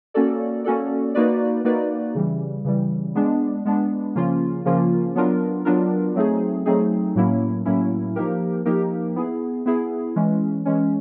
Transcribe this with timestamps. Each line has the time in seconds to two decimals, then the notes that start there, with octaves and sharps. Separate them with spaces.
0.14 A#3 C#4 F#4 A4 D5
0.64 A#3 C#4 F#4 A4 D5
1.14 A#3 D#4 F#4 B4 D5
1.65 A#3 D#4 F#4 B4 D5
2.15 C#3 E3 G3
2.65 C#3 E3 G3
3.15 G#3 B3 D4
3.65 G#3 B3 D4
4.15 C#3 F3 A#3 C#4 F4
4.65 C#3 F3 A#3 C#4 F4
5.15 F#3 B3 D4 F4 A#4
5.65 F#3 B3 D4 F4 A#4
6.16 F#3 A3 C4 D#4 G#4
6.66 F#3 A3 C4 D#4 G#4
7.15 A2 F#3 A#3 C#4 E4
7.65 A2 F#3 A#3 C#4 E4
8.16 F3 A#3 D#4 G4 A#4
8.65 F3 A#3 D#4 G4 A#4
9.16 B3 E4 G#4
9.66 B3 E4 G#4
10.16 E3 G#3 C#4
10.66 E3 G#3 C#4